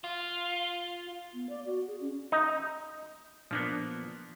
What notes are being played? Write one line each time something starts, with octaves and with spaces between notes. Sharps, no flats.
F4
B3
D5
F#4
G#4
C#4
D#4
A#2 F3 A#3 B3 D4